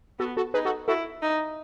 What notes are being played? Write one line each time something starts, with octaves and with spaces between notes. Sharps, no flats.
B3 F#4 A4
F#4 A4
D#4 G#4 B4
F#4 A4
E4 F#4 A4
D#4